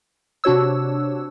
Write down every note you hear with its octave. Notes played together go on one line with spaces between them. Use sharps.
C3 D4 F#4 C#5 E6